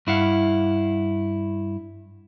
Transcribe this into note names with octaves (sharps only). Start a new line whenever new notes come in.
G2 E4 F5 F#5